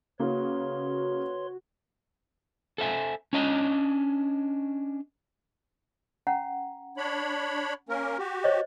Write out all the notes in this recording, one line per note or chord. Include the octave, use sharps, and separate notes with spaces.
C#3 A#3 F#4 B4 C#5 C6
A4 C5 E5 G#5
C#4 D4 C#5 D#5
C#4 F#5 A#5
D4 C#5 B5
A#3 C#4 A#4
F#4 G4
C5 C#5 D#5